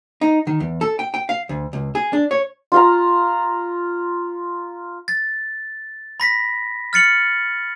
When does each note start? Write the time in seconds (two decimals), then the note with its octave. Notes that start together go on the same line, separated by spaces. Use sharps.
0.21 D#4
0.47 D#3
0.60 E2
0.81 A4
0.99 G5
1.14 G5
1.29 F5
1.49 D2
1.73 C#2
1.95 G#4
2.13 D4
2.31 C#5
2.72 F4 F5 A#5
5.08 A6
6.20 B5 A#6 B6
6.93 F6 A6 C#7 F#7